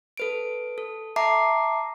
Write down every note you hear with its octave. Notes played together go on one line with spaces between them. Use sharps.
A4 B4 D7
A4
E5 A5 A#5 D6 C7